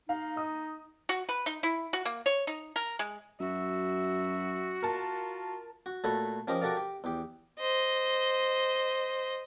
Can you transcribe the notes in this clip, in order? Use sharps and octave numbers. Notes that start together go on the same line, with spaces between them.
D#4 F5
D#5 D#6
F#4
B4
D#4
E4
F#4
A#3
C#5
D#4
A#4
G#3
F#2 F#4 E5
F4 A#4 A5
F#4
A#2 A3 F#4 A4 C#5 B5
F3 C#4 D#4 G4 A#4
F#4 G4 A4 A#4 D5 F5
G4
E2 G4
C5 D#5